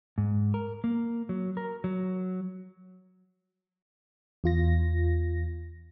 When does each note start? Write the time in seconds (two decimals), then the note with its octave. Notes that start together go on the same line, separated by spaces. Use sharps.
0.18 G#2
0.54 A#4
0.84 A#3
1.29 F#3
1.57 A#4
1.84 F#3
4.44 E2 F4 A#6